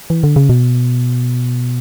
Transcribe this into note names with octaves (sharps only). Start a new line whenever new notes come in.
E3
D3
C#3
B2